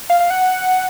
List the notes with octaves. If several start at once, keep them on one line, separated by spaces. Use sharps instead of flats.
F5
F5
F#5